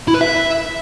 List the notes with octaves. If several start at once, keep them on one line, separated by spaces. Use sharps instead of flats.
E4
B4
E5